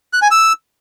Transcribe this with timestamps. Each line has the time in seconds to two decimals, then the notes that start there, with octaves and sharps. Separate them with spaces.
0.13 F#6
0.22 G#5
0.31 E6